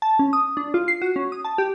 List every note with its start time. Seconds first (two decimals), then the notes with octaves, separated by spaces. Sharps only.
0.02 A5
0.19 C#4
0.33 D#6
0.57 D4
0.74 F4
0.88 C7
1.02 F#4
1.16 C#4
1.32 D#6
1.45 A5
1.58 G4